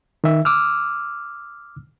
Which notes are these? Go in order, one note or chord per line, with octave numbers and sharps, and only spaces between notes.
D#3 E5
D6 E6 F6